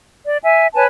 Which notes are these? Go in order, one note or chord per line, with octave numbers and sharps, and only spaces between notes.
D5
E5 G#5
B4 C#5 G#5 A5